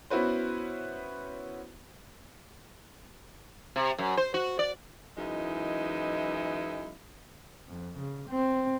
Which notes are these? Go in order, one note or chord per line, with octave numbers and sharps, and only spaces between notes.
B3 C#4 E4 F#4 B4 C5
C3
F#2
C5
F#4
D5
F#2 E3 G#3 D#4 E4
F2
C#3
C4